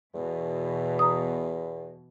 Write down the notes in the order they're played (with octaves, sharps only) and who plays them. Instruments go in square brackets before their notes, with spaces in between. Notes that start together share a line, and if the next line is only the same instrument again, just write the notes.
[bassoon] E2 [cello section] B2 E3
[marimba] A#5 D#6